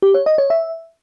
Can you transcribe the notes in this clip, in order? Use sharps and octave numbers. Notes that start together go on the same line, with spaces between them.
G4
C#5
D#5
C#5
E5